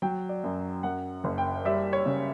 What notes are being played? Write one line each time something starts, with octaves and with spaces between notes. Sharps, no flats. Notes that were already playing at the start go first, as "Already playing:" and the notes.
F#3 G5
D5
F#2
F#2 F#5
F#1
G5
G3 E5
C#5
C#3